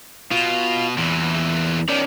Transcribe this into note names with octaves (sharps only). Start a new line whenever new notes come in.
B2 F4
E2 A#2 E3
D#3 C#4 D5